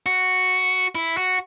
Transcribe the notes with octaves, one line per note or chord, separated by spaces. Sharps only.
F#4
E4
F#4